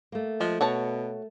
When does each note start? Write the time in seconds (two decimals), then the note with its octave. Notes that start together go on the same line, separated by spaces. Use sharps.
0.12 A3 A#3
0.41 F3 G#3
0.61 B2 F#4 C#5 A5